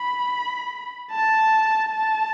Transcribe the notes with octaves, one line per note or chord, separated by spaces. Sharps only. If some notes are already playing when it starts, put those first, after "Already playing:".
Already playing: B5
A5
A5